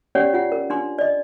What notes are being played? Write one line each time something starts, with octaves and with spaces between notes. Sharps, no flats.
C#4 G4 C#5 D5 F#5
F4 F#5
A#4
D4 C6
D5 D#5